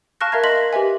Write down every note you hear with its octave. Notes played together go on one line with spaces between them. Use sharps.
F5 A5 C#6 F6 F#6 A#6
A#4 E5 F5 A#5 G#6
D#5 C6 A#6 B6 F#7
G4 B4 E5 G#5